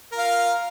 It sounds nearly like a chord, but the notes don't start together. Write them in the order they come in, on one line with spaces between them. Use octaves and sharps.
A#4 F4 F5